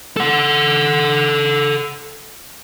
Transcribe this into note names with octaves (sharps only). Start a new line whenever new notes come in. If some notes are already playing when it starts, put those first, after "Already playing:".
A4 F#5